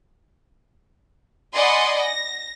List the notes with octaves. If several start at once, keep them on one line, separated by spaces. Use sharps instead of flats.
D5 D#5 F#5 G#5 B5 C6
A#6